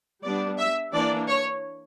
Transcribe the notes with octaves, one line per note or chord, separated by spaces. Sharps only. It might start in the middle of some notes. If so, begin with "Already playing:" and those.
G3 B3 D4 D5
E5
E3 A#3 D4 D5
C#5